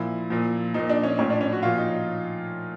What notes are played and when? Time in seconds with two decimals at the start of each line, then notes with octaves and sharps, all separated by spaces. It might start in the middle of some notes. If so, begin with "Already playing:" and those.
Already playing: A#2 F3 E4
0.30 A#2 F3
0.74 A#2 F3 D#4
0.89 D4
1.03 C#4
1.19 A2 F3 C#4
1.30 D4
1.41 C#4
1.52 F#4
1.63 A#2 F3 F4
1.78 D#4